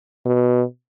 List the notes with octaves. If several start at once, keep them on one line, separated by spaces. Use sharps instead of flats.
B2